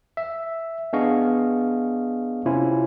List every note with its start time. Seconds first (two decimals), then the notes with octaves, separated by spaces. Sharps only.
0.17 E5
0.93 B3 D4 G#4 D#5 F5 C#6
2.46 C3 C#4 E4 F4 C5 G#5